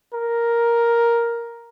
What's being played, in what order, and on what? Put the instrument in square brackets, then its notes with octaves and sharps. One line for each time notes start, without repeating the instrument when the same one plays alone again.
[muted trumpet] A#4